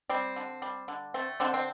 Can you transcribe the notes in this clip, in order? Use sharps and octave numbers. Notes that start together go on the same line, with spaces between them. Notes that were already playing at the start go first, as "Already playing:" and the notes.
G3 C4
D3
G3
D3
A3 C4
D3 C4
C4